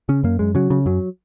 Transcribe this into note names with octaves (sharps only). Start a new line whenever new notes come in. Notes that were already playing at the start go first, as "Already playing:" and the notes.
C#3 C#4
F#2 A#3
F#2 G#3
C#3 F#3
C#3
F#2 F#3